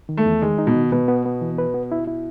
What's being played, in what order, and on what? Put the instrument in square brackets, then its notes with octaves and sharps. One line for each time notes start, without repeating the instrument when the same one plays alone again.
[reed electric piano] D#3
[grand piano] A3
[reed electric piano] E2
[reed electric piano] D#3 [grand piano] G#3
[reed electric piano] D#4
[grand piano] B2
[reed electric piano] D#3
[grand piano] B2 [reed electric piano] B4
[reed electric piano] B3
B3
E3
B4
B3
E4
E4